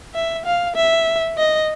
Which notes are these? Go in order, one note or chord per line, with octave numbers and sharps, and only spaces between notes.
E5
F5
E5
D#5